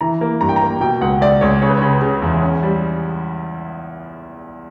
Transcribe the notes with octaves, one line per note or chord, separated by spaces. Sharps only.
E3 A#5
A#3
G2 A#5
G5
A#5
A#3
B2 G5
C#2 F#5
C#2 D5
C#2 C#5
C#3 C#5
B4
C#3 C#5
C#3
E2
C#4
G3